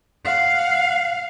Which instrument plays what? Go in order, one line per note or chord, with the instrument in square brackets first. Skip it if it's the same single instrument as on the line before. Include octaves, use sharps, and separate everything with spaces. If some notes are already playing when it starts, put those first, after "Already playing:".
[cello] F5 F#5